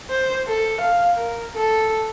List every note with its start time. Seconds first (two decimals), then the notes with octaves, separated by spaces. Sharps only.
0.10 C5
0.47 A4
0.81 F5
1.15 A#4
1.54 A4